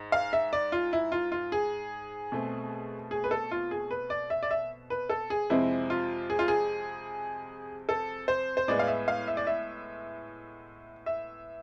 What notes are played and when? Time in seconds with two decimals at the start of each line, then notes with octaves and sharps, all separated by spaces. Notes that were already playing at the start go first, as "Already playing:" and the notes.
Already playing: G#2
0.12 F5
0.33 E5
0.53 D5
0.72 F4
0.93 E4
1.12 F4
1.32 F4
1.52 G#4
2.32 B2 A3 C4
3.11 G#4
3.24 B4
3.31 A4
3.51 F4
3.71 G#4
3.91 B4
4.10 D5
4.30 E5
4.43 D5
4.51 E5
4.90 B4
5.10 A4
5.30 G#4
5.50 F2 C3 G#3 C4 E4
5.90 F4
6.30 G#4
6.39 F4
6.48 G#4
7.89 A4
8.28 C5
8.57 C5
8.68 A2 G#3 B3 D5
8.79 F5
8.88 E5
9.08 F5
9.28 E5
9.37 D5
9.47 E5
11.06 E5